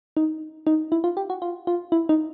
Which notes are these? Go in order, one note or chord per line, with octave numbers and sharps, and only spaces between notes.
D#4
D#4
E4
F4
G4
F#4
F4
F4
E4
D#4